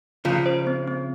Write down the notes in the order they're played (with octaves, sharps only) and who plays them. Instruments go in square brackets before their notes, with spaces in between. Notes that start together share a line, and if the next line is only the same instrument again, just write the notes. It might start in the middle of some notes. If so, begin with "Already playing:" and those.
[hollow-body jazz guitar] C#3 F3 [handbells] F4
[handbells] C5
C4
C4